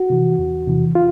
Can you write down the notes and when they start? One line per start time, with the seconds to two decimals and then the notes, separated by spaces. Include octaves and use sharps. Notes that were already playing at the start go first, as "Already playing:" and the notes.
Already playing: F#4
0.10 C3 E3
0.39 E2
0.68 C3 E3
0.95 F4